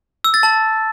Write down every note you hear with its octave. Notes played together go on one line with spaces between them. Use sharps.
E6
A6
A5